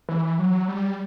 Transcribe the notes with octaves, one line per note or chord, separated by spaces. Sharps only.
E3
F#3
G3